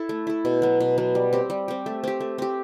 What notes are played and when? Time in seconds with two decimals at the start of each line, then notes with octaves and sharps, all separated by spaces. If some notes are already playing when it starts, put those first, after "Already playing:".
Already playing: E4 A4
0.09 A3
0.27 E4 A4
0.45 B2
0.62 F#3 B3
0.80 B2
0.98 F#3 B3
1.15 G3
1.33 C4 G4
1.50 G3
1.68 C4 G4
1.86 A3
2.04 C4 G4
2.20 A3
2.38 C4 G4